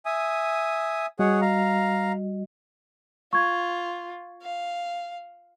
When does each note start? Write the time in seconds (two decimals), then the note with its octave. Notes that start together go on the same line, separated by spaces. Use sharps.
0.06 E5 G#5 D#6
1.19 G3 F#4 G#4 C#5 D#5 F#5
1.41 F5 A#5
3.33 F4 C#6 G#6
4.42 F5